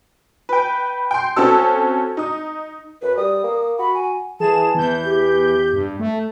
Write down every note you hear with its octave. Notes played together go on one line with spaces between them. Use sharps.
B4 G5
G5 C6
C4 C#4 F#4 A4 E6
D#4 D#6
F#2 B4
G3 D#6
A#3
F#4 B5
G#5
E3 G#4 A5 E7
E2 E3 G6
G4
G2
A3